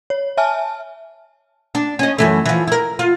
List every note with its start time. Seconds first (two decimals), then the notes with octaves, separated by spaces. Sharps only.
0.10 C#5
0.37 E5 G#5 A5 F6
1.75 D4
1.99 C#4 D#5
2.18 F#2 E3 A3
2.46 E3 F3
2.67 E4 A#4
2.99 F4